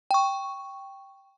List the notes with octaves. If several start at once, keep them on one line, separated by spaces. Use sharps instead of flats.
G5 C#6